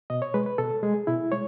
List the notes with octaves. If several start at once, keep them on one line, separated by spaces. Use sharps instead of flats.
B2 D#5
C#5
G#3 B4
B4
B2 A4
G#3 G#4
B2 E4
G#3 C#5